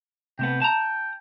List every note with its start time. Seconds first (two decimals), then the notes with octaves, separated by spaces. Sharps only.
0.39 C3 A3 B3 G5
0.62 G5 A5 A#5